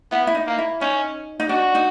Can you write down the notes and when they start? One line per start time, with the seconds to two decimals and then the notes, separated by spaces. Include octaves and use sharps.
0.12 B3 E4
0.27 E4
0.35 D#4
0.47 A#3
0.59 E4
0.81 C#4 D#4
1.40 D#4
1.49 D4 F#4
1.75 D#4